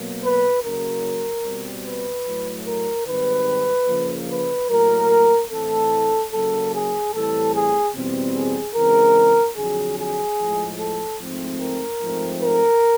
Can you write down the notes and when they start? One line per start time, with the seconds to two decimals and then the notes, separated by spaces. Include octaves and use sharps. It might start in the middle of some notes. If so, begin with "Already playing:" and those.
Already playing: B2 F#3 A#3
0.23 B4
0.63 C#3 F#3 A#3 A#4
1.44 B2 G3 C4
1.85 B4
2.26 A2 F#3 A3
2.66 A#4
3.06 G#2 D#3 G3 C4 B4
3.88 C#3 F3 A#3
4.29 B4
4.69 A2 F#3 A#3 A#4
5.51 A2 E3 A3 C4 A4
6.32 C#3 F#3 A#3 A4
6.73 G#4
7.13 A2 E3 G3 C4 A4
7.54 G#4
7.95 E2 B2 G3 C4
8.35 G#4
8.75 C#3 E3 G#3 C4 A#4
9.57 F2 D3 F#3 G#4
9.98 G#4
10.39 A2 F3 G#3
10.80 A4
11.20 G#2 F3 A3 C4
11.61 A#4
12.01 G#2 F3 A3 C4
12.42 A#4